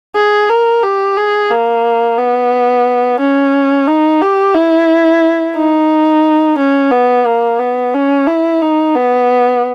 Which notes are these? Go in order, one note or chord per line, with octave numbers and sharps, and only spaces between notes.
G#4
A#4
G4
G#4
A#3
B3
C#4
D#4
G4
E4
D#4
C#4
B3
A#3
B3
C#4
E4
D#4
B3